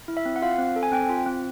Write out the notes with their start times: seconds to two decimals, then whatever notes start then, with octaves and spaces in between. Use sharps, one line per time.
0.08 E4
0.17 E5
0.25 C4
0.36 F#5
0.42 F4 F5
0.58 C4
0.76 A4
0.83 G#5
0.92 C4 G5
1.09 F4
1.26 C4